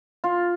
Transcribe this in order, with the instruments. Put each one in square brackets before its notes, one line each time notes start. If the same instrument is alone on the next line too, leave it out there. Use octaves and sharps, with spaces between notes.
[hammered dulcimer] F4